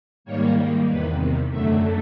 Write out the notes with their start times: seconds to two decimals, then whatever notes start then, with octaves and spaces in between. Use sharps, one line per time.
0.25 G#2 D#3 G3 A#3 C#5
0.87 E2 C3 D#3 B4
1.50 F#2 D3 F#3 A3 E5